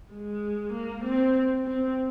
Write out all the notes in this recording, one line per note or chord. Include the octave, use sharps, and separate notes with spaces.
G#3
A#3
C4
C4